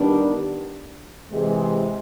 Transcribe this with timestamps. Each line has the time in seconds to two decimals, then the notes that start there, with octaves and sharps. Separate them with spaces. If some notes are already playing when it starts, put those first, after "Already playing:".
Already playing: D#3 G3 B3 D4
1.30 C3 E3 G#3